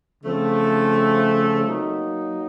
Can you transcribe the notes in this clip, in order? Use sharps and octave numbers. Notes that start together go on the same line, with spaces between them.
C#3 F3 A3 C4
F#3 A#3 D#4